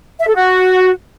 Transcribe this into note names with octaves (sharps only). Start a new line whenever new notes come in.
E5
A4
F#4